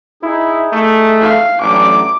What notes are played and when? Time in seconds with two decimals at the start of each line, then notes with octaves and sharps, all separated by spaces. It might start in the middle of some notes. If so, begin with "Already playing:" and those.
0.23 D#4 E4 G#4
0.73 A3
1.21 F5
1.61 A1 F#3 D4 D6